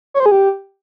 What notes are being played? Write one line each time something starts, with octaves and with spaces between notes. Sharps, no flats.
C#5
C5
G#4
G4